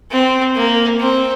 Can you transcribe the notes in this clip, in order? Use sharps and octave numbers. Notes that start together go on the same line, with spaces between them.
C4
A#3
C4